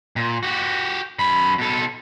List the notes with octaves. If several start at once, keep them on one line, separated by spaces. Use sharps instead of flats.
A#2
F#4 G4
F#2 B5
B2 A4